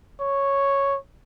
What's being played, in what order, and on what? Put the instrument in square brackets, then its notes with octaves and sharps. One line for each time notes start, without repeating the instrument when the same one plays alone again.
[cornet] C#5